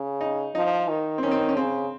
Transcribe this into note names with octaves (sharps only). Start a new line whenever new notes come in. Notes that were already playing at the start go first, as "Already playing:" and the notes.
Already playing: C#3
D#4
F3 D#4
D#3
C4
D#3 C#4
C4
C#4
C#3 C4